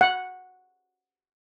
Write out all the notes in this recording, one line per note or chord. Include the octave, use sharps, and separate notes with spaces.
F#5